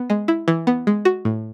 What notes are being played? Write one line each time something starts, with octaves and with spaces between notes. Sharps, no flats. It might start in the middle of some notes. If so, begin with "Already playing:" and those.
Already playing: B3
G#3
E4
E3
B3
G#3
F#4
A2